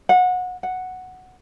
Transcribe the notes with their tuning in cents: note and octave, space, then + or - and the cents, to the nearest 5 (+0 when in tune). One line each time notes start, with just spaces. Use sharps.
F#5 -25
F#5 +0